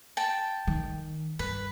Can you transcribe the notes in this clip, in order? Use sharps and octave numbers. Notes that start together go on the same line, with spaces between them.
G5 A5
D#3
G2 B4